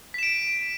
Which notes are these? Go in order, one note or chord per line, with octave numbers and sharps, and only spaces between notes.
B6 D7 E7